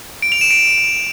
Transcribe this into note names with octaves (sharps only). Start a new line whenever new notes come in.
D7
F7
E7
D7